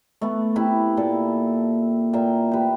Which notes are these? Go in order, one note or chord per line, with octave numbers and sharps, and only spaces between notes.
A3 B3
C4 E4 G4 B4
A#2 A4 D6
A#2 A#3 E5 G5
G4 B4